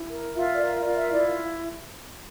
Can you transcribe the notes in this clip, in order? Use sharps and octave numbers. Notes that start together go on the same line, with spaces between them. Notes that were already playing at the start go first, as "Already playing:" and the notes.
Already playing: E4
A#4
F4 E5
D5
A#4 E5
D5
F4
E5
E4 D5